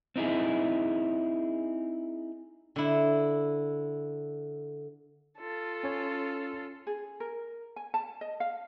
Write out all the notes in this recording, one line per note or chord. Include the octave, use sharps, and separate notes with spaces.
C4 D#4 E4 G#4
D3 E4
F4 A4
C#4 C#5
G#4
A#4
G#5
A5
D#5
F5